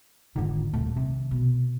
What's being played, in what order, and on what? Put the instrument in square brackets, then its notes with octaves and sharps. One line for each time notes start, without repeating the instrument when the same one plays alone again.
[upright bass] F1 F4 [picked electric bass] G#2 D3 D#3
[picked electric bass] D#1 A3 [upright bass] C2 A#2
[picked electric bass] C3 [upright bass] D#3
[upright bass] B2